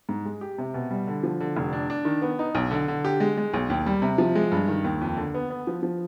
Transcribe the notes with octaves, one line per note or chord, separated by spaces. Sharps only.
G#2
G#3
G4
C3
B2
G3
D3
F3
D3
F1
D4
D4
D#3
B3
D#4
B1
D3
D3
G4
G#3
G#3
B1
D#2
G3
C3
F3
G#3
G2
D#3
D#2
F2
D3
B3
B3
F3
F3